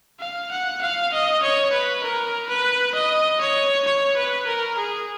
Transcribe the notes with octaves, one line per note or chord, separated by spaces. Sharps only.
F5
F#5
F5
D#5
C#5
B4
A#4
B4
D#5
C#5
C#5
B4
A#4
G#4